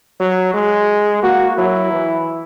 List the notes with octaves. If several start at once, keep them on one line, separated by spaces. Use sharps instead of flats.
F#3
G#3
A#3 F#4
F#3 E4
E3